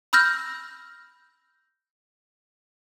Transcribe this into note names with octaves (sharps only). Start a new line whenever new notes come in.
B5 E6 F6 G6 A#6